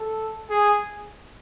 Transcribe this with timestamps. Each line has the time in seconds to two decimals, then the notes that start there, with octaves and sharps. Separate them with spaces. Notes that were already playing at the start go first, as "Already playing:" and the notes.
Already playing: A4
0.50 G#4